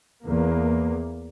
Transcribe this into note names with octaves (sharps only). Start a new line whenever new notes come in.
E2 A#3